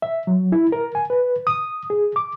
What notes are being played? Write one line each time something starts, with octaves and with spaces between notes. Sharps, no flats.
E5
F#3
E4
A#4
G#5
B4
D#6
G#4
D6